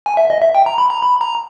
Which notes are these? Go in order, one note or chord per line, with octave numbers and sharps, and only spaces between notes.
G#5
E5
D#5
E5
G5
A#5
B5
A#5
B5
A#5